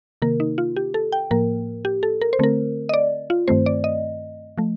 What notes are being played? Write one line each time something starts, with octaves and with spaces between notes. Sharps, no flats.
C3 D#3 A#3 A#4
D#4
F4
G4
A4
G5
A2 F3 A#3 A#4
G4
A4
A#4
C5
D3 A3 C4 A#4
D#5
D5
F4
G2 D#3 A3 C4 C5
D5
D#5
F3 A3